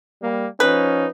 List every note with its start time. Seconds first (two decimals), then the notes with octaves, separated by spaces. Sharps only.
0.22 G3 A#3
0.60 F3 C#4 D#4 B4